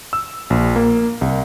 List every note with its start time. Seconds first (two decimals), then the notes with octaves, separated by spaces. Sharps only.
0.13 E6
0.50 A#1
0.76 A#3
1.21 C2